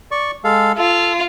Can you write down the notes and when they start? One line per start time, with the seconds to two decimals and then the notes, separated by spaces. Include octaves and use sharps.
0.11 D5 C#6
0.44 G#3 A4 F5
0.78 F4 A4